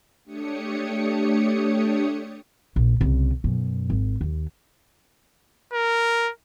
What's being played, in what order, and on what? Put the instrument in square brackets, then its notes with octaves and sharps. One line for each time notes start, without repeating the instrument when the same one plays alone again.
[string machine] A3 D4 G4 C#5 D#6 C#7
[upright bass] A#1
C2 C#3
F#2 B2
G#1
D#2
[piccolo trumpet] A#4